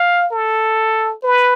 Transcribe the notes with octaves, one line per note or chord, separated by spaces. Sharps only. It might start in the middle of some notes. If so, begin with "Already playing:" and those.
Already playing: F5
A4
B4